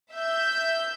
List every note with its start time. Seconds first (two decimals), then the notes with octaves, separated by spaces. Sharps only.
0.13 E5 G6